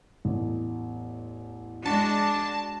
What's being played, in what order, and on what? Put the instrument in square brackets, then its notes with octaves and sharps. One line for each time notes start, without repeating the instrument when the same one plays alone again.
[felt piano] A1 E2
[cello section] G#3 D4 F#4 [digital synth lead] A5